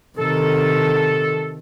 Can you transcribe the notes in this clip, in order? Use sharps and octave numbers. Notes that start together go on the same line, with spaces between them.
C3 D#3 A4